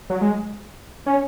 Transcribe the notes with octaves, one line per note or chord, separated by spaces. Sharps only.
F#3
G#3
C#4